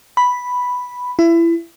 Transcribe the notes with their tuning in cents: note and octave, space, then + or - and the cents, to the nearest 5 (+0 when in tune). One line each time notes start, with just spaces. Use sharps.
B5 +0
E4 +25